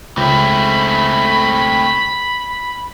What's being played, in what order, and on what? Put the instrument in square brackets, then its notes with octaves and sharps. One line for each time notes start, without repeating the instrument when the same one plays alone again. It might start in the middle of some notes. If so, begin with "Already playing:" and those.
[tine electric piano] C#2 [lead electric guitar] A3 C4 [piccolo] B5